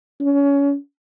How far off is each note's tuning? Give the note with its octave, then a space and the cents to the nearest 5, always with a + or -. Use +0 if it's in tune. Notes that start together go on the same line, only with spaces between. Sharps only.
C#4 +25